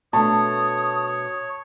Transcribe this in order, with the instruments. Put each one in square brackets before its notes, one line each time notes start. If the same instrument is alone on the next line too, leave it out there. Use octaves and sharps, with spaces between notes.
[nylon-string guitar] B2 A3 D4 [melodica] C#5 [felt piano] A5 [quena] D#6